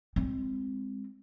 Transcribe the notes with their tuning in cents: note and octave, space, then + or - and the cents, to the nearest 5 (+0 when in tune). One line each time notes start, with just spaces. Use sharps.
G#3 -25 C4 +0